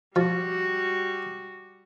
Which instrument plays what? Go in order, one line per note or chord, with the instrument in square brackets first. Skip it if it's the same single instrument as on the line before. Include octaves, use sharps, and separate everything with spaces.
[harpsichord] F3 [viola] G3 F#4